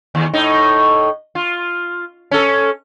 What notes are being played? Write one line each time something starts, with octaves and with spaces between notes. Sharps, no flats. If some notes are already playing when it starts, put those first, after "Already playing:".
D#2
A2 D#4
F4
C#4 A4